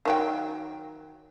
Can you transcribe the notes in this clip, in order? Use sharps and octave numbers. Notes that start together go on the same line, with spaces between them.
D#3 F#3 G5